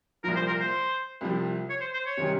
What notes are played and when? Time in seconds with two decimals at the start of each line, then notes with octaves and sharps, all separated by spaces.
0.24 C2 A#2 F3 A#4
0.36 C5
0.48 A#4
0.60 C5
1.21 C2 C3 F3
1.70 C#5
1.81 C5
1.94 C5
2.06 C#5
2.17 C3 D#3 G3 C#4